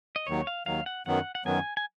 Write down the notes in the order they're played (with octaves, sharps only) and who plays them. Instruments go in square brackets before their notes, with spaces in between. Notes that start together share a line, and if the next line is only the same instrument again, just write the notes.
[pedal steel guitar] D#5
[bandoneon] D#2 D#3 F#3 [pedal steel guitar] C#5
[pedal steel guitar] F5
[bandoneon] D#2 D#3 F#3 [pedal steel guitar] F5
[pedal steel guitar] F#5
[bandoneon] F#2 D#3 F#3 B3 [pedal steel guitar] F#5
[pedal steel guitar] F#5
[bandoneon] F#2 D#3 F#3 B3 [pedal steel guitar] G#5
[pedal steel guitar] G#5